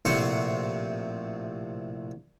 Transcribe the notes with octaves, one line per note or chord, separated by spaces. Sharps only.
A#1 A2 C3 C5 F#5 C#6